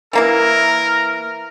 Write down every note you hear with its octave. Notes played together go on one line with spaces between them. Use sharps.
E3 A#3 E4 A#4